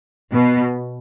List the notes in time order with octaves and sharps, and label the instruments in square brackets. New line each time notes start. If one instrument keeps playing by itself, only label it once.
[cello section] B2